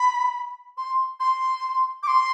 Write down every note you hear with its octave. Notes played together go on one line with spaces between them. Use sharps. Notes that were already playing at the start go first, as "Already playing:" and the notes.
Already playing: B5
C6
C6
D6
C6